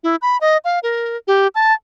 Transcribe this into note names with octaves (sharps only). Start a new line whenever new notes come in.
E4
B5
D#5
F5
A#4
G4
A5